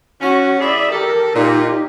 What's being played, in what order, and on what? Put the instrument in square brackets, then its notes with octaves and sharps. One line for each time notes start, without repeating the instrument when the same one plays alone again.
[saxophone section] C#4 [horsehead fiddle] F#4
[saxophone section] E4 G#4 E5 [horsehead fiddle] D5 B5
[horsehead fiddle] G4 A#4 [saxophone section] A4
[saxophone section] A#2 [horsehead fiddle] D#4 G4